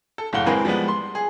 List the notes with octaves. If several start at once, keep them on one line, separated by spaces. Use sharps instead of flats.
A4
F#1 A2 F5 F#5 G7
E3 G#3 C4 G#4 A#4 B4
F3 G3 G#3 B3
C6
G#4